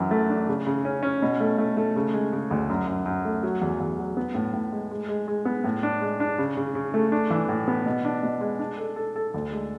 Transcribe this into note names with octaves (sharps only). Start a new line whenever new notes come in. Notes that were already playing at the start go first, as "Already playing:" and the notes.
Already playing: F#2 E3
A3
D4
C#3
C#3
C#4
C#4
B2
A3
A3
A3
C#3
G#3
C#3
D2
F#2
F#2
F#2
A3
F#3
E2
E2
F#3
B3
A2
A2
G#3
G#3
G#3
G#3
B3
A2
D4
G#3
D4
C#3
C#3
C#3
A3
D4
E3
A2
B3
B2
D4
B2
G#3
D4
A4
A4
A4
D2
G#3